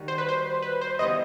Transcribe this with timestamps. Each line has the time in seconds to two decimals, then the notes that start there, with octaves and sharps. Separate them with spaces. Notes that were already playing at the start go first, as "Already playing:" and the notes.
Already playing: D#3 G3 D#4 F#4
0.08 C5
0.18 B4
0.29 C5
0.62 B4
0.81 C5
0.99 E3 G3 B3 E4 D#5